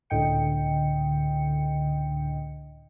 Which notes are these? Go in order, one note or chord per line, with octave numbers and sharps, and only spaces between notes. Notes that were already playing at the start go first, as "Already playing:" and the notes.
C#2 A2 D3 D#5 G5 C#7